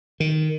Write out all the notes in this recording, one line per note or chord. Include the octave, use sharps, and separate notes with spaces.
D#3